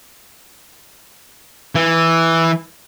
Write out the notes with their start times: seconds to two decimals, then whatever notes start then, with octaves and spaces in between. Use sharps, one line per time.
1.75 E3